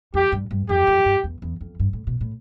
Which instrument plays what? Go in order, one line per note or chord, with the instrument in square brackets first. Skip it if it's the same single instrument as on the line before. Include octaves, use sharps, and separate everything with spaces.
[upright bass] F2 [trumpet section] G4
[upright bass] G2
G2
[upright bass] F2 [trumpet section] G4
[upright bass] F2
G2
E2
E2
F2
G2
A2
B2
A2